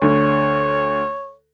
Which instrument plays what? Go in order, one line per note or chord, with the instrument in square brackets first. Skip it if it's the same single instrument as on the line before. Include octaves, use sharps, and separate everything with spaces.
[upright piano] D2 D3 [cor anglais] C#5